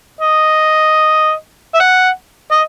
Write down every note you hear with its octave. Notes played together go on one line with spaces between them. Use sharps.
D#5
E5
F#5
D#5